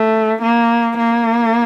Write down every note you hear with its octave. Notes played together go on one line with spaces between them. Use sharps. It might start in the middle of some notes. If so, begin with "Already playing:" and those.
Already playing: A3
A#3
A#3